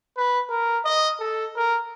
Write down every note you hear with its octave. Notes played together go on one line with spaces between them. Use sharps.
B4
A#4
D#5
A4
A#4